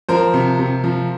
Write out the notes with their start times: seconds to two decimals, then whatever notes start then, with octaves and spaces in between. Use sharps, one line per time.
0.09 F3 A#4 C5
0.34 C3
0.59 C3
0.84 F3